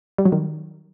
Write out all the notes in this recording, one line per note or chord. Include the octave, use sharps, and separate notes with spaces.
G3
F#3
D#3